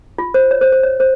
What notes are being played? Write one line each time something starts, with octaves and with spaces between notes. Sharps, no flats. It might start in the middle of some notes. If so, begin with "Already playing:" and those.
F4
C5
C#5
C5
C5
C#5
C5